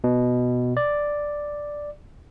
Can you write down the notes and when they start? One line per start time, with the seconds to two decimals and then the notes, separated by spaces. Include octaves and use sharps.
0.04 B2
0.77 D5